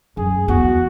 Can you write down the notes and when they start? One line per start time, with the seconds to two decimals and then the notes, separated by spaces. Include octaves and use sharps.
0.17 F#2 G#4
0.48 E2 F#4